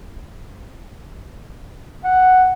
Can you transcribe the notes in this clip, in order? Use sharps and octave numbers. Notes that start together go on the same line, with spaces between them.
F#5